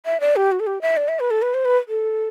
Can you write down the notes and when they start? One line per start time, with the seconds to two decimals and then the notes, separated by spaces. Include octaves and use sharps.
0.06 E5
0.20 D5
0.36 G4
0.52 F#4
0.60 A4
0.67 G4
0.81 E5
0.97 D5
1.08 E5
1.20 B4
1.30 A4
1.42 B4
1.54 C5
1.65 B4
1.88 A4